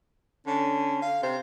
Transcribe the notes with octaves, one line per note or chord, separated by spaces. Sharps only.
D3 C#4
F5
C3 C5